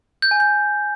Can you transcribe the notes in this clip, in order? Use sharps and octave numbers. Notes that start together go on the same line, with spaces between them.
G6
G#5
G6